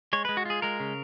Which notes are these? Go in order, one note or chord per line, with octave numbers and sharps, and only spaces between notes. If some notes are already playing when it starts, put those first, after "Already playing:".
G#3 C#5
G#3 B4
F#4
F4 G#4
G#3 A#4
C#3